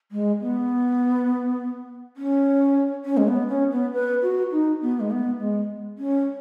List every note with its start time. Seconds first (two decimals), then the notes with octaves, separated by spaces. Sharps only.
0.12 G#3
0.41 B3
2.17 C#4
3.05 C#4
3.17 G#3
3.28 B3
3.49 C#4
3.71 B3
3.94 B4
4.22 F#4
4.52 D#4
4.82 B3
5.00 G#3
5.11 B3
5.40 G#3
5.98 C#4